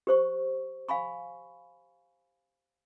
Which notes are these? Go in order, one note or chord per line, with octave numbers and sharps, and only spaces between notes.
G4 C5 C#6
F5 G#5 B5 C#6